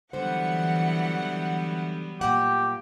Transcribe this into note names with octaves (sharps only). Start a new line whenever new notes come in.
D3 E3 F#3 G3 B3 C5 F#5
A#2 A#3 G4 F#5